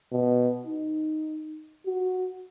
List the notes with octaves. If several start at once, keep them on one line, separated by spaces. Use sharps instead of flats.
B2
D#4
F#4